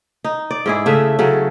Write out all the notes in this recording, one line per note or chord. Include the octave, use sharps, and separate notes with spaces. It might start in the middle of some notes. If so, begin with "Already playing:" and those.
D#4
D5
G#2 E4 G#4
C#3 A3 E5
C#3 F#3 A4